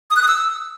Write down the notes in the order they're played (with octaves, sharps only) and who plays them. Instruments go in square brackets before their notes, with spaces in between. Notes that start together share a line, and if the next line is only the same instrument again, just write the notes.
[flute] D#6
F#6
D#6
E6